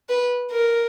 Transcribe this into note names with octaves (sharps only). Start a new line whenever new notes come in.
B4
A#4